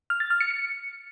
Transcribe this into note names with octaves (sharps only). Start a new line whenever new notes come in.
F6
A6
F6
C#7
C#7